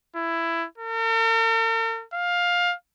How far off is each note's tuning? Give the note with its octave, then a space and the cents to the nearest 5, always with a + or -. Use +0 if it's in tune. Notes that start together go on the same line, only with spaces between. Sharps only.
E4 +15
A#4 -45
F5 +15